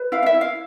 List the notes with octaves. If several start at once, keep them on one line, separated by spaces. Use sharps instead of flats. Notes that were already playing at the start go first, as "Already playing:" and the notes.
Already playing: B4
E4 F5
F5
E5
E4
F5